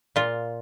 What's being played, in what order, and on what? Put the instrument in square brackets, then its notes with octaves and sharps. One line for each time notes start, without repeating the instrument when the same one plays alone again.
[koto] A#2 F4